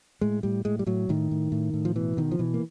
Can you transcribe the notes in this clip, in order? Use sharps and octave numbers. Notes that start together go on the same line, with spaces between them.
A2 G#3
A2 G3
A2 G#3
G3
A2 F#3
A2 D#3
A2
A2
A2
F3
B2 E3
B2 D#3
F3
B2 E3
A#3